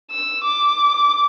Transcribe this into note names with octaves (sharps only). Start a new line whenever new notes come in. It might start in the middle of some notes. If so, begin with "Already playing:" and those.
E6
D6